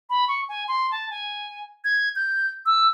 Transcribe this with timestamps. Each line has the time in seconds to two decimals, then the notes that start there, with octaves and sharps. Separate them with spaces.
0.10 B5
0.28 C#6
0.49 G#5
0.68 C6
0.91 A5
1.10 G#5
1.84 G#6
2.16 G6
2.66 E6